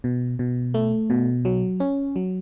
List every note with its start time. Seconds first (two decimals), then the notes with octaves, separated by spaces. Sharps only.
0.04 B2
0.39 B2
0.74 A3
1.10 B2
1.45 F#3
1.80 C#4
2.16 F#3